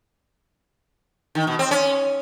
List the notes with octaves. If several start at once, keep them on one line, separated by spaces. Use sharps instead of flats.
D#3
B2
C4
C#4